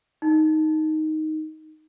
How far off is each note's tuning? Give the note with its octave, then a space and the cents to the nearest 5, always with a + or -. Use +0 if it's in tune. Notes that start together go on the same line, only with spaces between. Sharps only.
D#4 +5